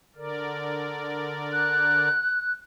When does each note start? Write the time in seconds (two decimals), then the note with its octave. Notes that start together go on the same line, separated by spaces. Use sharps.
0.16 D3 A#4 D5
1.53 F#6